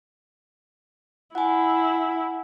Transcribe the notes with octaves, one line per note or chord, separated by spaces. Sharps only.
E4 F#5 G#5